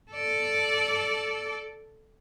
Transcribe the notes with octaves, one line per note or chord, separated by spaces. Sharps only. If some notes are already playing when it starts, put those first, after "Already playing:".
A4 D5